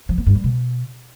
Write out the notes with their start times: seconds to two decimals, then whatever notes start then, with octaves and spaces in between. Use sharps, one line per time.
0.09 F3
0.18 B3
0.26 G2
0.35 G3
0.44 B2